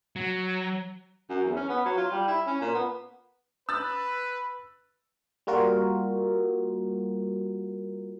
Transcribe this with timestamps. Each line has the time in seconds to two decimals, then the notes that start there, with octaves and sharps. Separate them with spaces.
0.16 F#3
1.30 F#2
1.45 E2
1.56 C#4
1.69 B3
1.86 F#3
1.97 F4
2.12 G3
2.28 E4
2.47 C#4
2.61 A#2
2.74 B3
3.69 B4 E6 F#6 A6
5.47 G3 A#3 F4 F#4 A#4